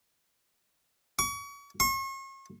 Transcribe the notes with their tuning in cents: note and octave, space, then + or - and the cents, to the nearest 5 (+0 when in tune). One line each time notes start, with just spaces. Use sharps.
C#6 +35
C#6 -40